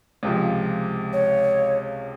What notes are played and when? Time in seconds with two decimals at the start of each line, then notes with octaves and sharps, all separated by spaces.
0.23 C#2 C3 F3
1.13 C#5